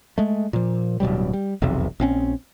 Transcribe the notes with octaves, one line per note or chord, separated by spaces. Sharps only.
G#3 A3
A#2 F3
D1 B2 F#3 G3
G3
F1 B1 E2 C3
A#1 C4 C#4